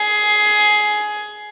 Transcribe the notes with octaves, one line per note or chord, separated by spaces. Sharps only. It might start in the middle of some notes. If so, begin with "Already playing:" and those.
Already playing: G#4